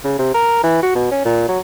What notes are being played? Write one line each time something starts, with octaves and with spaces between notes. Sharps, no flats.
C#3
C3
A#4
E3
F#4
B2
C#4
A#2
F#3